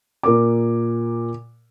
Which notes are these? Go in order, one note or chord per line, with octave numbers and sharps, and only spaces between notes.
A#2 A#4 D6